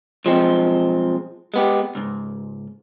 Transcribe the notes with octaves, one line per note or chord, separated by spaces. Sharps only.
B1 F3 G#3 C4
G#3 B3 G4
C#2 G#2